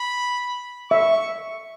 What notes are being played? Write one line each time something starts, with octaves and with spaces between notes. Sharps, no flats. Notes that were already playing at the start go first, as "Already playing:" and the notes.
Already playing: B5
E5 C#6